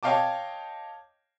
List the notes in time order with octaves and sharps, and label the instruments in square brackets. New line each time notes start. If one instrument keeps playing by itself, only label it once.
[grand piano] C#5 D#5 F5 G5 A5 D6